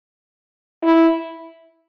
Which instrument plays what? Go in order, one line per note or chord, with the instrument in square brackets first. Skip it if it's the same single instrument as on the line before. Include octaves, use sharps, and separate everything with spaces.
[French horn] E4